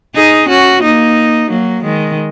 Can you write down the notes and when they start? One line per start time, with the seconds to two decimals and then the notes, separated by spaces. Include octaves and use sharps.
0.15 D#4 G#4
0.48 C#4 F#4
0.83 A#3 D#4
1.50 F#3 A#3
1.84 D#3 G#3